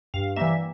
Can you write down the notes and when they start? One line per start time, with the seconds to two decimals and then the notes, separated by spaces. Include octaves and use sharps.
0.14 G2 F5
0.36 E3 G3 A#3 E5